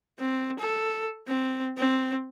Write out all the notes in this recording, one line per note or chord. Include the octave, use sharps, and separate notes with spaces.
C4
A4
C4
C4